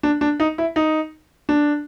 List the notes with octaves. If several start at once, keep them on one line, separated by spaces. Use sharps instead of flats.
D4
D4
D#4
E4
D#4
D4